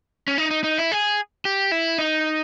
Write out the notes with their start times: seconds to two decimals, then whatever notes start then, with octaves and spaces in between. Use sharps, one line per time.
0.28 C#4
0.38 D#4
0.51 D#4
0.64 D#4
0.78 E4
0.92 G#4
1.45 G4
1.72 E4
1.98 D#4